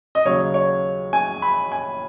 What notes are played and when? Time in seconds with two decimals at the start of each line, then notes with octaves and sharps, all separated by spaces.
0.15 D#5
0.25 D#2 C#3 F#3 C#5
0.54 C#5
1.13 G#5
1.42 B5
1.72 G#5